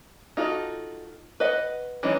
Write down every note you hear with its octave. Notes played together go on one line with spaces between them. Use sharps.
D#4 F4 F#4 A4
B4 D#5 F#5
E3 G#3 C#4 D#4